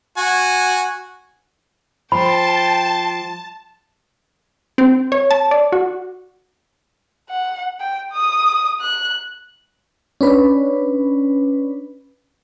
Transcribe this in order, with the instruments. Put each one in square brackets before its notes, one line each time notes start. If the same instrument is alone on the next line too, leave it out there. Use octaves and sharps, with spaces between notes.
[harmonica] F#4 G#5
[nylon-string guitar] F3 [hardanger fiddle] G5 C6 [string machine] A5 [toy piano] B5
[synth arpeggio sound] C4
C#5
A5
D5
F#4
[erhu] F#5
G5
D#6
F#6
[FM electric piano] C#4 D4 B4